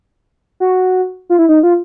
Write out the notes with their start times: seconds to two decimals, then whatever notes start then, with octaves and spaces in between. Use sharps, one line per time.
0.60 F#4
1.30 F4
1.39 E4
1.49 D#4
1.63 F4